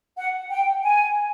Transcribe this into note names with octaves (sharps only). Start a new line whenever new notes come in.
F#5
G5
G#5